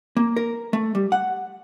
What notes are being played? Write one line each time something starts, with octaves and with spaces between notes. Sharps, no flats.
A#3
A#4
A3
G3
F#5